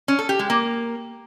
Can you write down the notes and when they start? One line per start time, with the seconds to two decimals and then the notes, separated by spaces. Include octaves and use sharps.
0.08 C#4
0.19 A4
0.29 G4
0.39 G#3
0.50 A#3